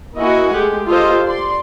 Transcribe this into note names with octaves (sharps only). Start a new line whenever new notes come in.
A#3 E4 F#4 D#5 F#5 G#5
G#3 A3 G4 G#4
F4 G4 A4 C5 D#5
D5 C6